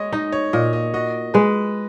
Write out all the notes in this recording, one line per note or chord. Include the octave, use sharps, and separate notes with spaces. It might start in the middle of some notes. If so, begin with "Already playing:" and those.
Already playing: G#3 C#5 D#5
D#4 D#5
C#5
A#2 D#5
D#5
F#4 D#5
G#3 B4